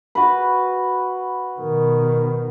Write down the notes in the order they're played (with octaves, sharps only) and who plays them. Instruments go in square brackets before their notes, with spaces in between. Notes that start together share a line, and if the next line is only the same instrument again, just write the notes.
[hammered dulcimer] F#4 B4
[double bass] B2 D#3